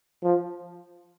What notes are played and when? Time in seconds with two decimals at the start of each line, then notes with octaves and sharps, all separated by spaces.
0.23 F3